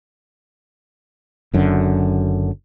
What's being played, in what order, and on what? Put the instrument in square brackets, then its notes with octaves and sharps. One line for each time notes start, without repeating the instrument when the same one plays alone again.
[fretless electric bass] F#1 F#2 D3